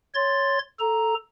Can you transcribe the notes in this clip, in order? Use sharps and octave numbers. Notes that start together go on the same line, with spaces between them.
C#5 C6 A6
A4 A#5